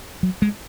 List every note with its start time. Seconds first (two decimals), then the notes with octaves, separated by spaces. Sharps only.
0.23 F#3
0.42 G#3